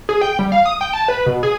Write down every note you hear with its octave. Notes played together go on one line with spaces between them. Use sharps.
G#4
G5
G3
F5
D#6
G5
A5
B4
B2
G#4